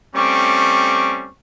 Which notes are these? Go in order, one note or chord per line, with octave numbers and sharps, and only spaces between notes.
G3 A3 C4 C#4 C#6 D6